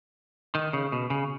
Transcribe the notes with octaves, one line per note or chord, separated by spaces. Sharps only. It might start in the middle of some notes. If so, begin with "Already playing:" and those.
D#3
C#3
B2
C#3